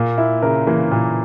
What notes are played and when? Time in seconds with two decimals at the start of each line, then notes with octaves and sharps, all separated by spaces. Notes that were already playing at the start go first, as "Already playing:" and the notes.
Already playing: A#2 A#3
0.18 E4
0.42 C#3 A#4
0.67 E3 A#3
0.91 A#2